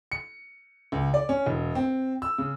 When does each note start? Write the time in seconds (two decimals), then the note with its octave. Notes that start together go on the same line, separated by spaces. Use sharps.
0.12 C#7
0.92 C#2
1.14 D5
1.29 C#4
1.46 E1
1.75 C4
2.22 E6
2.38 C#3